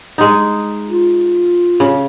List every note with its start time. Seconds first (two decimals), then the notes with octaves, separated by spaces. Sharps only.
0.18 G#3 D#4
0.89 F4
1.80 C#3